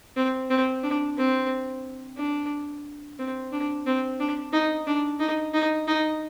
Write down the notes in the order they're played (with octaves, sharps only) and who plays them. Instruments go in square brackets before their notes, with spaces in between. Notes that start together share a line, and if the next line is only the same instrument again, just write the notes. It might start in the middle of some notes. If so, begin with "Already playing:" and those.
[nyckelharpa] C4
C4
D4
C4
D4
C4
D4
C4
D4
D#4
D4
D#4
D#4
D#4